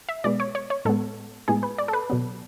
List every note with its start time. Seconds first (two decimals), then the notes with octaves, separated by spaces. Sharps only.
0.09 E5
0.24 B2 G#3 B3 D5
0.40 C#5
0.55 C#5
0.70 C#5
0.85 A2 G#3 B3 A4
1.48 A2 G#3 B3 G#4
1.63 B4
1.78 D5
1.88 A4
1.93 B4
2.10 B2 F#3 B3